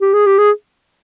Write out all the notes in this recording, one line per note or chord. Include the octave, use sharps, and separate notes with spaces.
G4
G#4
G4
G#4